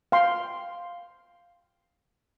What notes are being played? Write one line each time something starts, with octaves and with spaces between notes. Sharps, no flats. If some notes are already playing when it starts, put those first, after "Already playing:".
F5 G5 C6